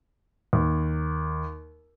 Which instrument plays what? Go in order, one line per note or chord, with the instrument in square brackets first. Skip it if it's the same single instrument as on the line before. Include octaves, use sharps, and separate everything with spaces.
[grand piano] D#2